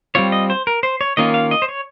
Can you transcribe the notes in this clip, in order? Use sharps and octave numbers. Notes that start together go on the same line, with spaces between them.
G3 C4 F4 C#5
D#5
C5
A#4
C5
C#5
D#3 A#3 C#4 F4 D#5
F5
D#5
C5
C#5